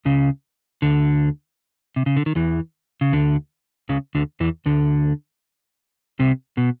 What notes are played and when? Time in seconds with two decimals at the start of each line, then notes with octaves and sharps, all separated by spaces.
0.05 C#2 C#3
0.82 D2 D3
1.96 C3
2.06 C#3
2.17 D3
2.26 D#3
2.35 E2 E3
3.01 C#3
3.13 D2 D3
3.89 C#2 C#3
4.15 D2 D3
4.40 E2 E3
4.66 D2 D3
6.19 C2 C3
6.57 B2